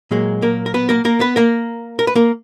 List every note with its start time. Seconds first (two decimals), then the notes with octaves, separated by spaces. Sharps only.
0.11 A#2 F#3 G#3 A#3 G#4
0.42 A#3 A#4
0.66 A#4
0.74 B3 B4
0.89 A#3 A#4
1.05 A#3 A#4
1.20 B3 B4
1.36 A#3 A#4
1.99 A#4
2.07 B4
2.16 A#3 A#4